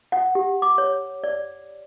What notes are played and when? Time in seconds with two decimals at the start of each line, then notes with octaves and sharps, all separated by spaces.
0.12 F#5
0.35 G4
0.62 D6
0.78 C#5
1.24 D5